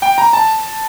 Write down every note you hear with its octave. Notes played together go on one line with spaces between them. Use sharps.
G5
A#5
A5